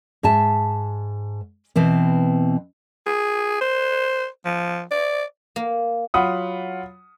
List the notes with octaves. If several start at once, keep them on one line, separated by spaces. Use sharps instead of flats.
G#2 E5 A5
B2 E3 C4
G#4
C5
F3
D5
A#3
F#3 F4 F#5 B5 D#6